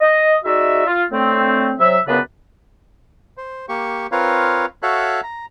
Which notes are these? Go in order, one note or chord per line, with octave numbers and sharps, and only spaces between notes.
D#5
G#3 D#4 F#4 D5 E5
F4
A2 D3 A3 C4
C3 F#3 E5
C#2 F#2 C#3 B3 D4 B4
C5
A#3 G4 C#6
C4 F4 A#4 B4 C#5 F5
F#4 A4 C#5 E5 F5 F#6
A#5